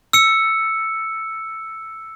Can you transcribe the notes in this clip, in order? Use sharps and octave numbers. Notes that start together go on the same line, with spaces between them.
E6 C#7